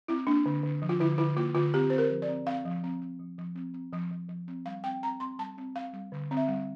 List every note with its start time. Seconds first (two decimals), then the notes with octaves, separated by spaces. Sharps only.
0.08 C4 E4
0.27 A#3 D4
0.46 D3
0.64 D3
0.82 F3
0.89 F4
1.00 D3 E4
1.18 D3 E4
1.36 A#3 F4
1.55 D3 F4
1.74 C4 G4
1.90 C4 C5
1.98 A#4
2.10 F3
2.22 D5
2.28 C4
2.46 C4 F5
2.65 F3
2.84 C4
3.01 C4
3.20 F3
3.38 F3
3.56 C4
3.74 C4
3.92 F3
4.11 F3
4.29 F3
4.48 C4
4.66 G3 F5
4.84 C4 G5
5.03 C4 A#5
5.20 C4 C6
5.39 G3 A5
5.58 C4
5.76 C4 F5
5.93 G3
6.12 D3
6.31 C4
6.37 E5
6.48 G3